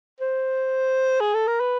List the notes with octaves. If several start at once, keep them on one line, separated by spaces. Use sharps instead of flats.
C5
G#4
A4
A#4
B4